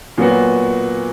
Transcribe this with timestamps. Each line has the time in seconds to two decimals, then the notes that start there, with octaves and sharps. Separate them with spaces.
0.18 A#2 F#3 B3 F#4